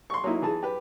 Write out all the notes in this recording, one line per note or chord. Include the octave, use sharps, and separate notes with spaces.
C6 C#6
F#3 A#3 D#4 E4
E3 G#4 A5
G4 B4